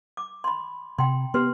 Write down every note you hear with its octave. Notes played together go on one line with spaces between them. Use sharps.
D6
B5 C6
C3 G5 A#5 C6
B3 G4 B4 C6